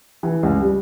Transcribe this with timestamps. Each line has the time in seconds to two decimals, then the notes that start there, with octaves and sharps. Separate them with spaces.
0.23 E3
0.43 C#2
0.60 G3